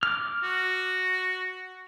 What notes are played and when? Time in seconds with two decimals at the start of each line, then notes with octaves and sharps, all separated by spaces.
0.03 D6 F6
0.43 F#4